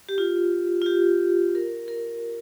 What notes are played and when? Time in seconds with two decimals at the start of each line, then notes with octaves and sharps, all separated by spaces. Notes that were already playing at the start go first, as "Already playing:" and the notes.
0.09 G4
0.18 F4
0.82 F4
0.86 G4
1.55 A#4
1.88 A#4